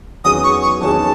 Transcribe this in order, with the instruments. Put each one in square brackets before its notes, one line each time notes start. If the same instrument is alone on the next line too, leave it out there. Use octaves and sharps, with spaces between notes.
[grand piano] E2 D#3 F#3 C#4 G#4 [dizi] D#6
[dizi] C#6
C#6
[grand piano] E2 D#3 F#3 C#4 G#4 [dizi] A5